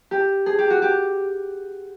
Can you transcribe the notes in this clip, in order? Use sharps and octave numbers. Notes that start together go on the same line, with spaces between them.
G4
G#4
G4
F#4
G4